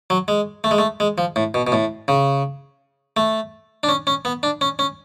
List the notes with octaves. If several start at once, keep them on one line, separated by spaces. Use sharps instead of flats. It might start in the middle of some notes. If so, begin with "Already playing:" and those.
F#3
G#3
A3
G#3
A3
G#3
F3
A2
B2
B2
A2
C#3
A3
D4
C#4
C#4
B3
D4
C#4
C#4